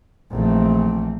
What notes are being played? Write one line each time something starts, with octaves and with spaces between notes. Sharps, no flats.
A#1 D#3 E3 A3 C4